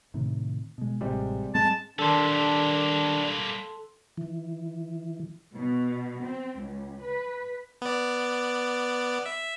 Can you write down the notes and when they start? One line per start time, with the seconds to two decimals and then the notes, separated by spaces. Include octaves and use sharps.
0.14 A2 C3 D#3
0.78 B2 G#3
1.01 A1 C3 G3 G#3
1.55 G#2 G3 G#3 C4 A5
1.99 D#3 G3 A#3 D4 A4 C6
4.17 E3
5.55 B2
6.23 C4
6.58 C#2
7.02 B4
7.82 B3 D5
9.26 E5